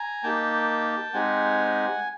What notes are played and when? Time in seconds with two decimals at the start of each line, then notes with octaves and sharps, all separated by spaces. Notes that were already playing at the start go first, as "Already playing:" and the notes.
Already playing: G#5 A#5
0.23 A#3 D#4 G4 G5 A5
1.14 G#3 C4 D#4 G4 F#5 G#5